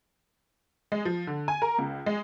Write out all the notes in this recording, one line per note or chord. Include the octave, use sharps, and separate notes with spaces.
G#3
F3
D3
G#5
A#4
C#2
G#3